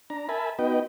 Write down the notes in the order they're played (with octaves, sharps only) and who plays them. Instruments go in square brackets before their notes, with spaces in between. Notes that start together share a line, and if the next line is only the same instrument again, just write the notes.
[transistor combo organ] D4 A#5
A#4 E5 G#5 A5 B5
B3 D#4 F#4 B4 D#5 G5